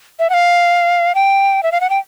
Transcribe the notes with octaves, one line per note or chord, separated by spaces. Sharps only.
E5
F#5
F5
G5
E5
F5
F#5
G5